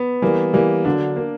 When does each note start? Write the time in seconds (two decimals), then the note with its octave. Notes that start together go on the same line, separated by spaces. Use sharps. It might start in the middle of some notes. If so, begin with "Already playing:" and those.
Already playing: B3
0.22 E3 G3 A#3
0.53 E3 G3 A#3
0.85 D3 F#3 D4
1.16 A#3